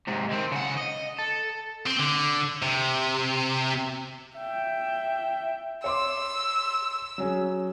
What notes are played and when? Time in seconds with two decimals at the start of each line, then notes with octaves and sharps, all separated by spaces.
0.08 G#2 C3
0.32 D#3 C4
0.52 C#3 F#5
0.78 D#5
1.19 A4
1.87 C4
2.00 D3
2.62 C3
4.37 E5 G5
5.84 C#5 C6 D6 E6
7.18 F#3 C#4 G#4